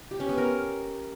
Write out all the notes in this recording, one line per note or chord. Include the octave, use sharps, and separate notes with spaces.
G4
C#4
B3
A#4